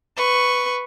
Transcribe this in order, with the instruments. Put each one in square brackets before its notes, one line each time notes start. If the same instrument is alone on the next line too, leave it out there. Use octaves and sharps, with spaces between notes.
[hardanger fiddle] B4 C#6